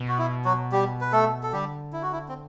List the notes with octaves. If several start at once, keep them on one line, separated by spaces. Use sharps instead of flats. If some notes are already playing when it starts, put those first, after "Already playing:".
Already playing: B2
F#4
E4
F#3 F#4
G3 G4
B4
A3 A4
A4
D3 G3 G4
E4
F#4
E4
C4